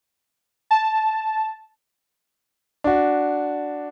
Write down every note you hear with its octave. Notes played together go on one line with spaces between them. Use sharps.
A5
D4 F#4